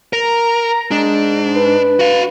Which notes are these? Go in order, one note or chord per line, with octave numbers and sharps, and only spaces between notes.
A#4 A#5
G#2 D4
B4
F#4 F5